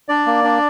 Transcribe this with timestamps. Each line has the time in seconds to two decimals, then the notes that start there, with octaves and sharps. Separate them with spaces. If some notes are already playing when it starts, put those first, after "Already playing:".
0.09 D4 D5
0.26 A#3
0.44 D4